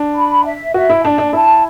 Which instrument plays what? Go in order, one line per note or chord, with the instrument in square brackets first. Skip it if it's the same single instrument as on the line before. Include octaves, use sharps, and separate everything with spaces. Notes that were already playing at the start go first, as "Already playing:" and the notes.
Already playing: [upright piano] D4
[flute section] B5
E5
[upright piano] F#4 [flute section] E5
[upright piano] E4
[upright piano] D4 [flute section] A5
[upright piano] D4
[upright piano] E4 [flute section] A5